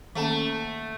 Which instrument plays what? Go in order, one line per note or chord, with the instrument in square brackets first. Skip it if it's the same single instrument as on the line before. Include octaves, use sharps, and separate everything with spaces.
[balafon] D#3 A#3 C#4 [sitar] A3 [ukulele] A4 F#5 A5